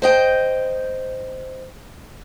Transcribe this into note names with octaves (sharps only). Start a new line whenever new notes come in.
C5 D#5 G5